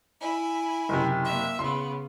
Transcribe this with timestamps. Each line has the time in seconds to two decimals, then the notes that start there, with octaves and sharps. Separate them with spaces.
0.21 E4 G#5
0.89 F#1 C3
1.24 A#3 E5
1.59 C#3 B3 C6